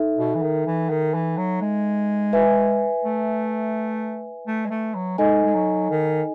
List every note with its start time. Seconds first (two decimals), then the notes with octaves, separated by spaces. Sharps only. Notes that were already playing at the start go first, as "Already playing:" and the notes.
Already playing: D#4 A4 E5
0.18 B2
0.35 E3
0.42 D#3
0.67 E3
0.90 D#3
1.14 E3
1.37 F#3
1.61 G#3
2.33 B4 E5 G#5
3.04 A3
4.47 A3
4.66 G#3
4.70 A3
4.95 F#3
5.18 G#3 D#4 A4 D#5 G#5
5.45 G#3
5.55 F#3
5.90 D#3